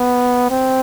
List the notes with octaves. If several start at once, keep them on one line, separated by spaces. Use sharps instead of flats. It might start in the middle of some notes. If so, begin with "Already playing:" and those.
Already playing: B3
C4